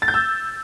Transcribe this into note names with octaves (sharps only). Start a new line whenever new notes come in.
A6
G6
E6